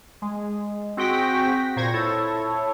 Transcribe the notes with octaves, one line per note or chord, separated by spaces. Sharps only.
G#3
C4 F#4 G#4 G5 A#6 B6
A#2 C5 C#6 G#6 A#6
E4 A4 C#5